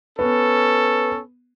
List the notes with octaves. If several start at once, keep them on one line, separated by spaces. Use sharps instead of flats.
B3 C#4 A4